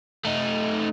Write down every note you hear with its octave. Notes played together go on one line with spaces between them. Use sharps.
A3 D#4